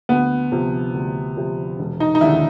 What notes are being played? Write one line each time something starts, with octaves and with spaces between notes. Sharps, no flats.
D2 B3
C3 F3
D2
C3 F3
E1
D#4
D#4
D#2 D3 E4